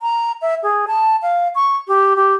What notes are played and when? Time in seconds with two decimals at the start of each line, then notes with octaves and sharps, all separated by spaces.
0.01 A#5
0.42 E5
0.63 G#4
0.88 A5
1.22 F5
1.55 C#6
1.88 G4
2.16 G4